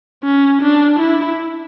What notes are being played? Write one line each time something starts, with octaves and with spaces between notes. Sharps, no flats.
C#4
D4
E4